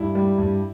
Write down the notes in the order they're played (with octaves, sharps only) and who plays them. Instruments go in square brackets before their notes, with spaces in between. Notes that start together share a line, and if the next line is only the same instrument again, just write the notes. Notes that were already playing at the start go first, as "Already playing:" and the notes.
Already playing: [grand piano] G2 E4
G3
G2